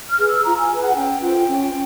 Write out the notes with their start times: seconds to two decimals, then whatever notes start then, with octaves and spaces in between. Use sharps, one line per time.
0.10 F6
0.18 G#4 B4
0.27 E6
0.45 F4 A#5
0.57 G#5
0.70 G#4 B4
0.83 F#5
0.95 C#4 G5
1.21 F4 A4 C5
1.48 C#4